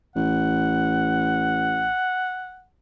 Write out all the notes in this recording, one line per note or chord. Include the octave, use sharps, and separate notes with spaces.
A1 F#5